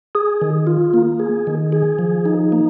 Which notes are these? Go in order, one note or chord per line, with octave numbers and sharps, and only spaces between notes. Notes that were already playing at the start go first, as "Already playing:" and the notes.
G#4
D#3
F4
A#3
G#4
D#3
G#4
F3
D#4
A#3